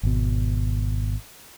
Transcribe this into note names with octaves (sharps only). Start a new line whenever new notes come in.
G#1 B2